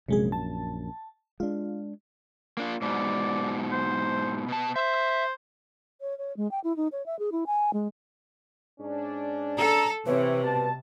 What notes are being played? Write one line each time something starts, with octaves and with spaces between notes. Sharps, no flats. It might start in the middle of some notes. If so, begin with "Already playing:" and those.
A#1 F#2 C3 G#3 G#4
A5
G#3 D4 F4
A#3 D4 F4
G#2 B2 D5
C5
B2 A5
C5 E5
C#5
C#5
G#3
G5
E4
D#4
C#5
E5
G#4
E4
G#5
G#3
G#2 C#4 D4
A4 A#5
C3 E3 E4 B4 C#5
B2 G3 A5